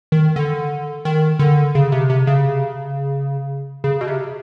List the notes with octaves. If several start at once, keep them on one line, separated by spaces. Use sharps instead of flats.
D#3
D3
D#3
D3
C#3
C3
C3
C#3
C#3
B2
C3